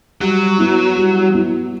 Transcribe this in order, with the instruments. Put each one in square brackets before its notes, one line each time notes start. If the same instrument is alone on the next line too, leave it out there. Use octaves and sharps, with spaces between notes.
[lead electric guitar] F#3 [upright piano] G3
[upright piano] B3 E4
G3
B3 E4